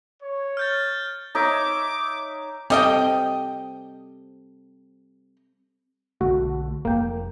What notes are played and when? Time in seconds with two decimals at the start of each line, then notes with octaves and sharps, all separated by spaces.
0.21 C#5
0.57 F6 G6 A6
1.35 D#4 C#5 E5 D6
2.70 G3 C4 A4 D#5 G5
6.21 B1 D3 A3 F#4
6.85 F1 A#3 G5